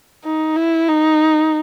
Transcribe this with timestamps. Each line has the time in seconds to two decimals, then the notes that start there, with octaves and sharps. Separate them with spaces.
0.25 D#4
0.56 E4
0.88 D#4